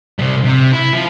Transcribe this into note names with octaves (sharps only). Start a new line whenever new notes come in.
C3 G3
C3
E4
F3 F4